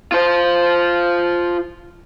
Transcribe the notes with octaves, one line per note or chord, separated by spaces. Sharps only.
F4 C5